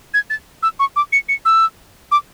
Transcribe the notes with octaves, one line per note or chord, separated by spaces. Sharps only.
G#6
A6
E6
C#6
D6
C#7
C#7
E6
D6